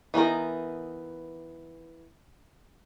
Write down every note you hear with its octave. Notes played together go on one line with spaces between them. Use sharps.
E3 B3 D#4 A#4